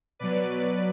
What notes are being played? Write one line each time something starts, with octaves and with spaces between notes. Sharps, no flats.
B2 F#3 B4 D5